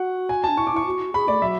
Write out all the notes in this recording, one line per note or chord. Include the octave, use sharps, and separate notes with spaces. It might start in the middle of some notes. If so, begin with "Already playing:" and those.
Already playing: F#4 F#5
G#5
D4 A5
E4 C#6
D6
E4 C#6
F#4
G#4 B5
A3 D5
F#3 E5